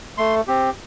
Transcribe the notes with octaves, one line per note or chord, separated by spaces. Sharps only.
A3 C6
C4 G4